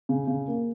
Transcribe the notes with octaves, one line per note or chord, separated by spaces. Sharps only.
C#3
C#3
A#3